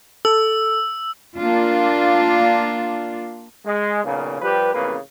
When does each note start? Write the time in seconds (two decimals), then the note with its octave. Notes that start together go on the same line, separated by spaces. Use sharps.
0.25 A4 E6
1.36 A#3 D4 F4
3.66 G#3
4.04 B1 A#2 C#3
4.42 F3 G3 G4 B4
4.74 A1 F2 C#3 A#3 B4